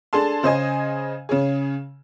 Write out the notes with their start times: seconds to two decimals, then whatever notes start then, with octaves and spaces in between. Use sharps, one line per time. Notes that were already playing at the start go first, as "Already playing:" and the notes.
0.13 D4 G#4 A4 A5 C6
0.43 C#3 C5 D#5 G#5
1.29 C#3 C#4 G#4